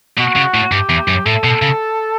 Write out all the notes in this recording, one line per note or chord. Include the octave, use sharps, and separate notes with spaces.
B2 F#4
C#3
A2
G2 G4
E2
F#2
A2 A4
B2
C#3